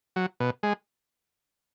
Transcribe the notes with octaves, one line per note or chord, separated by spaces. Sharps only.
F#3
B2
G#3